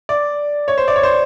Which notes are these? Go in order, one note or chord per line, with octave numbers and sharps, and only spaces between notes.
D5
C#5
C5
D5
C#5
C5